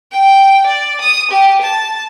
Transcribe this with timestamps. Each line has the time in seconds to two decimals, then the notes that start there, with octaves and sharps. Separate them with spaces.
0.12 G5
0.67 D5
1.01 D#6
1.31 G4
1.61 A5